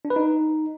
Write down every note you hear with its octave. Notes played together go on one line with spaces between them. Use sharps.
D4
B4
D#4